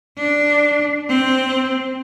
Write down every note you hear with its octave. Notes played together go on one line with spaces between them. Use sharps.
D4
C4